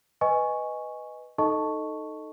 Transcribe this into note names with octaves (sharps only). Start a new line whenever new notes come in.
B4 D#5 G#5 C#6
D#4 A4 D#5 A5 C#6